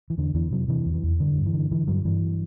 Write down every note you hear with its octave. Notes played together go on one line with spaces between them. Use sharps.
E3
E2 D3
E2 E3
C3 F#3
C3 E3
E2
E3
E2
G2 D3
G2
E3
D3
D3 E3
G2 F#3
G2 E3